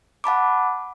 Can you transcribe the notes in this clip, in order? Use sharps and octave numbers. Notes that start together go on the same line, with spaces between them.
F#5 A5 B5 D6